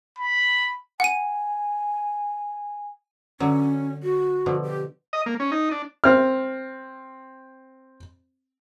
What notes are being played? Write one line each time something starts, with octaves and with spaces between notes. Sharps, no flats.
B5
F#5 G#5 D#7
D3 F#3 C#4
F#4
B2 D3 F3
G4
D#5
A#3
C#4
D#4
D4
C4 F6